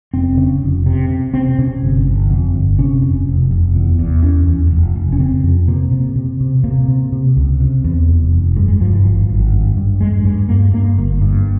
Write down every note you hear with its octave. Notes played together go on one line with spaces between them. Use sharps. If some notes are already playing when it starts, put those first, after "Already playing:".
F1 C4
C#3
F1
C3
C3
C3 C4
C3 C#4
G1
G1
F2
G1
C3 C#4
F1
F1
F1
E2
E2
E2 C#4
E2
F1
F1
C#4
C#3 C4
F2
C3 A#3
C3
C3
C3
C3 A#3
C3
C3
C#2
C3
E2
F1
F1
G2 G#3
G#3
G2 F3
E3
G#1 F3
G#1
G2
G2
G2 G#3
G2 G#3
G2 A#3
G2 A#3
G1 A#3
G2